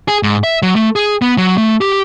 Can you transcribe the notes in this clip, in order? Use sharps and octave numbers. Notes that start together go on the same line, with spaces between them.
G#4
G#2
E5
F#3
A3
G#4
B3
F#3
A3
G4